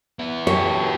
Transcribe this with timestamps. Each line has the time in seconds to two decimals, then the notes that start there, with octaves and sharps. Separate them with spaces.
0.19 B3 E4
0.47 F#4 G4 A4 C#5